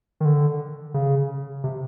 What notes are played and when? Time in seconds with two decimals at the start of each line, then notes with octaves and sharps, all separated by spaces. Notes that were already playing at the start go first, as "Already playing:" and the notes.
0.20 D#3
0.25 D3
0.94 C#3
1.64 C3